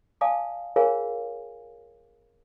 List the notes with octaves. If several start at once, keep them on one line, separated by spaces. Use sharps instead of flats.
D5 F5 G#5 A5 D6 D#6
F4 G#4 A#4 C#5 F5 G#5